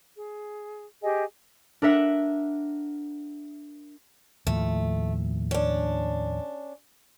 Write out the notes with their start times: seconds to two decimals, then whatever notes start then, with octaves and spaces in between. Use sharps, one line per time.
0.16 G#4
1.02 G4 G#4 D#5 G#5
1.82 D4 A#4 E5 F#5
4.47 D#2 A2 F3 A3
5.51 C#4 D4